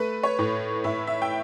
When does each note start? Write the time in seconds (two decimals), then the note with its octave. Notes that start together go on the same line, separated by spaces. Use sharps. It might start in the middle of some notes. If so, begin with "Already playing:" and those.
Already playing: A3 B4
0.23 C#5
0.39 A2
0.84 A2 E5
1.07 E5
1.22 G5